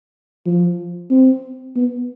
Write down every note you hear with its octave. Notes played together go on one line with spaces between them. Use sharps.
F3
C4
B3